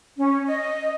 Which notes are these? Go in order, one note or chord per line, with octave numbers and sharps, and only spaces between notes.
C#4
D#5